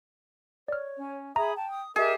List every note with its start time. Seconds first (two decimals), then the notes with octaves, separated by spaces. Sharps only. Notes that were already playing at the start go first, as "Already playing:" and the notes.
0.68 C#5 D5 F6
0.97 C#4
1.36 G#4 E5 A#5 B5 D#6
1.56 G5 A5
1.70 D#6
1.96 G4 G#4 A#4 D#5 E5